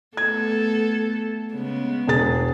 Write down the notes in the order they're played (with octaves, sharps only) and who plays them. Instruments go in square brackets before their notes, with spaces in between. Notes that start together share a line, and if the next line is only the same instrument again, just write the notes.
[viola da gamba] A3 B3 A4 [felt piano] G#6
[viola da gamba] C#3 G#3 B3
[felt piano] E1 G#4 A6